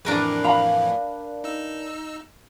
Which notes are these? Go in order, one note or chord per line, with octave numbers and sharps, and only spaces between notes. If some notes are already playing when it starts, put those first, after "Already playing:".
F2 A2 E3 D4 A#4 B4
F5 A#5 B5
D#4 E6